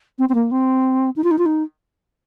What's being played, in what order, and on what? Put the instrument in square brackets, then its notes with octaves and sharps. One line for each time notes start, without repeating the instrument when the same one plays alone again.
[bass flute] C4
C4
A#3
C4
D#4
F4
D#4
F4
D#4